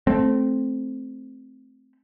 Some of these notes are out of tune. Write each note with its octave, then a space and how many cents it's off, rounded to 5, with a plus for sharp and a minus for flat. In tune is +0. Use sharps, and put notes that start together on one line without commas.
A3 -10 C4 +0